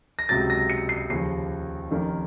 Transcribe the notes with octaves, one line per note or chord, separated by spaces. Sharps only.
A#6
C#2 C3 F#3 A6
A#6
C#7
C7
D#2 C#3 F3 C7
F1 F2 D#3 A#3 C#4